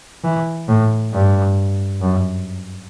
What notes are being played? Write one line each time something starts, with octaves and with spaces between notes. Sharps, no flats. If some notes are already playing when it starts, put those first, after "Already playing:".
E3
A2
G2
F#2